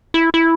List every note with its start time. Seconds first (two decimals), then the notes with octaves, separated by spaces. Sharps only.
0.14 E4
0.34 E4